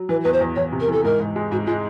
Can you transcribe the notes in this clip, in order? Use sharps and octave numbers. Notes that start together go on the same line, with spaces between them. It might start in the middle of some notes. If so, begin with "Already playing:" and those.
Already playing: F#3
E3 B4
E2 B4
C5
E2
E2 C#5
C3
A#4
E3 A4
G#2 A#4
G#2
G#3
G#2 F#4
G#3 F4